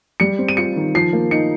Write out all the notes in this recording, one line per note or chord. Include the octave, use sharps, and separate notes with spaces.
G3 C#7
C4
D#7
F4 C#7
D#3
F3 C7
A#3
D#4 C#7